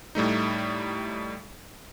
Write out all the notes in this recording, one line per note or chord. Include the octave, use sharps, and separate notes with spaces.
A2 G3 A3 D#4